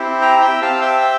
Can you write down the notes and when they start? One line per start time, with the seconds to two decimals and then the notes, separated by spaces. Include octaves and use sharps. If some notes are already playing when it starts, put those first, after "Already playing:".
Already playing: C4 E4 G4
0.21 G5 A#5
0.42 E5 G5
0.62 C4 G4 F5 A5
0.82 E5 G5